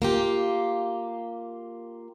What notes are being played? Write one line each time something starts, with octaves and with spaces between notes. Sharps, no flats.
A#3 F4 G4